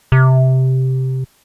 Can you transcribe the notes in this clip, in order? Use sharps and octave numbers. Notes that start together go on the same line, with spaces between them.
C3